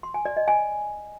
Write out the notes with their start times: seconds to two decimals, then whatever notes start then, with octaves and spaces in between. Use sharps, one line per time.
0.03 C6
0.14 G#5
0.25 D5
0.37 D#5
0.48 G#5